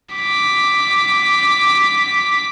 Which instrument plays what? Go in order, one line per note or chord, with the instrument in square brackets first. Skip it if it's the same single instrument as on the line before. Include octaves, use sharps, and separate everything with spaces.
[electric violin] D6 B6